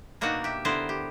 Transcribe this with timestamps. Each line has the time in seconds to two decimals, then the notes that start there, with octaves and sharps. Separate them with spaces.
0.21 B2 A#3 D4 D#4 F#4
0.44 G4 E5
0.65 D3 B3 E4 A#4 C5
0.89 G4